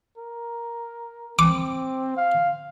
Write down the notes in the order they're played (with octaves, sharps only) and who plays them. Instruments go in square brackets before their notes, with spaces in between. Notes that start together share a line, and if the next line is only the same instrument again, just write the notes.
[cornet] A#4
[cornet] C4 [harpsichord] D6
[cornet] F5